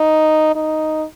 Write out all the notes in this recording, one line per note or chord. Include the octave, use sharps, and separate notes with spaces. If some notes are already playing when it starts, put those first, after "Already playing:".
Already playing: D#4
D#4